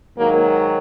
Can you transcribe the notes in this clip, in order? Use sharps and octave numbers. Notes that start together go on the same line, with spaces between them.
G#2 D#3 F#3 A#3